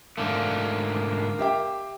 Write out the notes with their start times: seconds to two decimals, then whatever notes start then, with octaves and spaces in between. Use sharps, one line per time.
0.18 G#2 D3 A3 A#3
1.39 G4 E5 G5